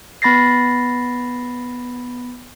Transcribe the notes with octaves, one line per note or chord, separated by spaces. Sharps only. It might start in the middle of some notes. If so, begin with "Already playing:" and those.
B3 B5 A6 A#6 C7